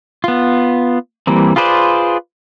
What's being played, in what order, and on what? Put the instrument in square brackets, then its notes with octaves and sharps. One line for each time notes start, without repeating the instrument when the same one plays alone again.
[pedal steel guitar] B3 F4
E3 G3 A#3 C4
F4 G#4 B4 C5 D5